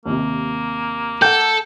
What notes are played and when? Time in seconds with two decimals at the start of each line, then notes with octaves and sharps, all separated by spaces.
0.06 D#2 C3 A#3
1.22 A4 F#5 G5 G6